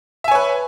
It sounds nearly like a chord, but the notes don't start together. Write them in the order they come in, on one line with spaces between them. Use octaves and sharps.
E5 G#5 C#5 B4